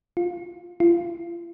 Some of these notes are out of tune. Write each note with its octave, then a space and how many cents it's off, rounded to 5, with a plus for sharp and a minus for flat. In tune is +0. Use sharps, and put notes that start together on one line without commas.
F4 +5
F4 -35